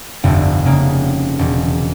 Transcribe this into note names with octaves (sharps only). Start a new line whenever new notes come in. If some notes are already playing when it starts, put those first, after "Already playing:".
F1 C2 G2 D3 F3
C#3 G#3 A#3
E1